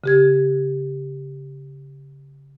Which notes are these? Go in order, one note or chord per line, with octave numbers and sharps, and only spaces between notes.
C#3 G4 G#6